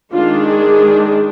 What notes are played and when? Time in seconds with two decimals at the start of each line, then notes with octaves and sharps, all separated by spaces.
0.12 D#3 G#3 D4 F4
0.46 G#4